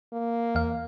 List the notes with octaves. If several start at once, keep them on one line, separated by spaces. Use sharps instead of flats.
A#3
E2 F5